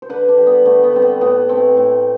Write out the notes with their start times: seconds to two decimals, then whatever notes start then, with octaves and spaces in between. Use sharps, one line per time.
0.02 C5
0.09 D3 B4
0.28 D4
0.38 G3
0.47 B3
0.65 D3 A3
0.84 B3
0.93 G3 C4
1.02 B3
1.21 A2 B3
1.49 E3 A3 C4
1.77 A2